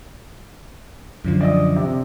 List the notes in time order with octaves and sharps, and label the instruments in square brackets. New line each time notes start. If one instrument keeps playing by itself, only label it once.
[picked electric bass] F#2 D3 F3
[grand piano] D5 D#5 D#6
C3